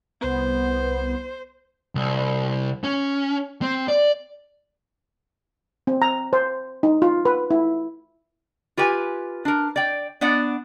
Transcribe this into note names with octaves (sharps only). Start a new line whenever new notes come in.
C2 B3 C5
C2
C#4
C4
D5
C4
A#5
C5
D#4
F4
B4
E4
F4 G4 B4 G#5
D4 A#4
D5 G5
B3 D4 D5 F#5